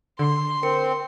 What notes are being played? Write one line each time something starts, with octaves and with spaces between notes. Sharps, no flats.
D3 C6
C4 A#4 C#7